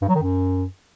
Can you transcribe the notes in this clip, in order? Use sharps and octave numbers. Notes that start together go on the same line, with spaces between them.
G2
F#3
D#3
F#2